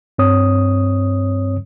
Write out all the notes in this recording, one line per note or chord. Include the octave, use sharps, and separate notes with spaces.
G2 C4 C#5 D#6